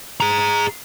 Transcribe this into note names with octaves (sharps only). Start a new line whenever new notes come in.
G#4 A#5